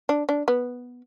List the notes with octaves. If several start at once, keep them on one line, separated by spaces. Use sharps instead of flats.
D4
D4
B3